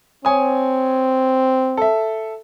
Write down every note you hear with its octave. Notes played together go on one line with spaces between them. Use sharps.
C4 C#5 G#5 D#6
A4 E5